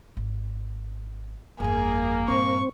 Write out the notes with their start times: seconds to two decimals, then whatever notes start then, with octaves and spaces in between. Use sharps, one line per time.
0.17 G#1
1.60 G1 F2 A#3 G#4
2.28 G2 A#2 C4 C#6